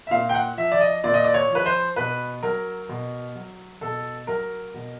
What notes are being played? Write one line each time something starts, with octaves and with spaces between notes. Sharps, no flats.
E5
A#2 F5
G5
F#5
F3 E5
D5
D#5
A#2 D5
D#5
D5
C#5
F3
B4
C5
B2 B4
F#3 A#4
B2
F#3
B2 A4
F#3 A#4
B2